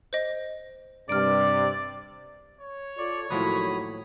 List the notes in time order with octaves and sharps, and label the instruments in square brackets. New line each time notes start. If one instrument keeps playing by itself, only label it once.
[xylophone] C5 D#5
[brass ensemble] G2 C3 [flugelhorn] D5 [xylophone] F6 D7
[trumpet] C#5
[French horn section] F4 A4 [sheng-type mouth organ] D5 C#6
[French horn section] D#2 F#3 [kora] A2 F3 F#4 [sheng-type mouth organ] B5 D#6